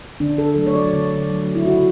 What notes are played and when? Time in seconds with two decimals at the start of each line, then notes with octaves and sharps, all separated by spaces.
0.20 D3 D4
0.38 A4
0.56 F#3 A3
0.67 C#5
0.75 D5
0.93 D3
1.29 F#3 A3
1.55 E4
1.66 C#3 F#4